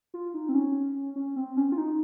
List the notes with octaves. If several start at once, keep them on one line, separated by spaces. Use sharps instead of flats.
F4
D#4
C4
C#4
C#4
C4
C#4
F4
D#4